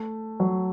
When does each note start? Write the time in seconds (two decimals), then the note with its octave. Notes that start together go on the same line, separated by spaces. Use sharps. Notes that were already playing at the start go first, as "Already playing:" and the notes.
Already playing: A3
0.40 F#3